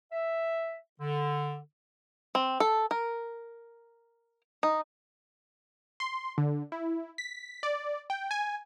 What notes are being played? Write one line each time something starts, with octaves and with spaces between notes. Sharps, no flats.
E5
D3
C4
A4
A#4
D#4
C6
D3
E4
B6
D5
G5
G#5